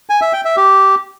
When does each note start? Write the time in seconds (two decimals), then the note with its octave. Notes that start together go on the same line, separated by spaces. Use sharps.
0.10 G#5
0.21 E5
0.33 G5
0.45 E5
0.57 G4